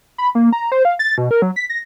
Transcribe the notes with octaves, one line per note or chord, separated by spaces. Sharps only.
B5
A#3
A#5
C5
F5
A6
B2
A#4
F#3
B6
A#6